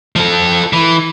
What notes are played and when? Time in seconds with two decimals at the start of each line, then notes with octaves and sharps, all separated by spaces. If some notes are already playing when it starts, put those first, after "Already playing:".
0.16 F3 A4
0.73 E3